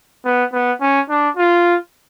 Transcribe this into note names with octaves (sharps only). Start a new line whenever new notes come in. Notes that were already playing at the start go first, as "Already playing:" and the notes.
B3
B3
C#4
D4
F4